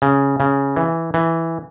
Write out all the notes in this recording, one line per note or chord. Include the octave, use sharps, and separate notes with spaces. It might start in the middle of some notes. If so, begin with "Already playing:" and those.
C#3
C#3
E3
E3